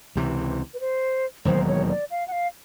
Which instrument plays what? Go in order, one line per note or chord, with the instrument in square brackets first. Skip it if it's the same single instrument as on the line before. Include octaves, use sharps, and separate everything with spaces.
[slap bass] C#2 C3 E3
[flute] B4
C5
[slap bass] E1 D#2 D#3 F#3 [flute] C5
[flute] C#5
D5
F5
F#5
F5